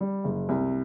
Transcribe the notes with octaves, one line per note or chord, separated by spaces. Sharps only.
G3
F#1
C2